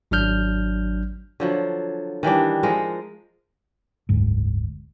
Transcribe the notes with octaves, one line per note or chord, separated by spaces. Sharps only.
G#1 F#3 D4 F6 G6
D3 F3 F#3
D#3 E3 G3 D4
F3 G#3 A#4
F#1 D2 G#2